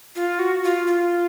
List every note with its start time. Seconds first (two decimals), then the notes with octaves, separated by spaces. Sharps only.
0.16 F4
0.39 F#4
0.64 F4
0.87 F4